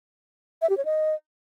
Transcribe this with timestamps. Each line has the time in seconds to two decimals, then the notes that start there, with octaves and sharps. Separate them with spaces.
0.62 E5
0.70 G4
0.77 C#5
0.85 D#5